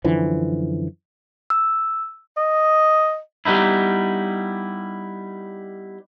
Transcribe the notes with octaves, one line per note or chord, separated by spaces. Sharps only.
F#2 D3 E3 F3
E6
D#5
G3 B3 D#4 E4